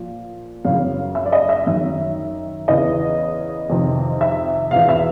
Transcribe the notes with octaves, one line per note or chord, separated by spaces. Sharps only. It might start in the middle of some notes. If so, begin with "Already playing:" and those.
Already playing: A#2 F3
F#2 C#3 E3 F5
E5
D5
D#5
E5
F#2 D#3 E5
E2 C#3 E3 D#5
F2 C3 D#3
E5
E2 B2 F5
E5